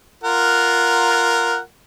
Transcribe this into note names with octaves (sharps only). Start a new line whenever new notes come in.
F4 A#4 F#5